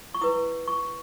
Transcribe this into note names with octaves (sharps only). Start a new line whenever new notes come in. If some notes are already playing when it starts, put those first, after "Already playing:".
C#6
E4 B4 D#6
C#6